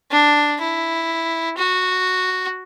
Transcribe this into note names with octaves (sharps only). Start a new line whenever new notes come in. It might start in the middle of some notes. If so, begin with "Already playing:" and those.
D4
E4
F#4